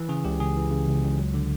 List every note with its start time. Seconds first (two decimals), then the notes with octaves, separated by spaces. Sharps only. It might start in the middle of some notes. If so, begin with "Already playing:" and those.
Already playing: E3
0.09 C#3 G#4
0.25 C#2 G4
0.40 C#2 G#4
0.56 E3
0.71 C#3
0.88 C#2
1.03 C#2
1.18 F#3
1.34 D3